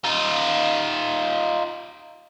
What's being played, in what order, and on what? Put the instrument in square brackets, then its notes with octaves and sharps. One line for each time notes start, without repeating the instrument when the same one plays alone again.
[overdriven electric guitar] D#4 F4